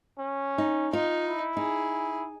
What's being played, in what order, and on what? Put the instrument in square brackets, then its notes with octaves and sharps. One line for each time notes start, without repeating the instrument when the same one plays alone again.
[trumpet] C#4
[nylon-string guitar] D#4
[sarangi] D#4 [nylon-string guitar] F4
[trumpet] E4
[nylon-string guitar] D#4 [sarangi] G#4